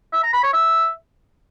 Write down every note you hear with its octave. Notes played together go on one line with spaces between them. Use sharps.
E5
A#5
B5
C#5
E5